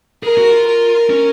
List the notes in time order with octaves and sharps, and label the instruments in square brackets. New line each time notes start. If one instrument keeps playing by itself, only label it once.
[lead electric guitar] G#4 [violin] A#4
[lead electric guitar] F#4
F4
[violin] A#4
[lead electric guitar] C#4